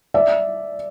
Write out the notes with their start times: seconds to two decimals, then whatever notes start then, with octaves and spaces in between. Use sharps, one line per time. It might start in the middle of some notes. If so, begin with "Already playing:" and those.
0.14 D5 E5